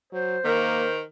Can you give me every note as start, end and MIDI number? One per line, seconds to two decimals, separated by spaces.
0.12 0.37 54
0.12 1.02 72
0.45 1.01 51
0.45 0.85 58